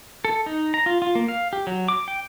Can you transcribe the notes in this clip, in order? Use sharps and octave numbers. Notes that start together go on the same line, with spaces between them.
A4
D#4
A#5
F4
F4
A#3
F5
G4
F#3
D6
G5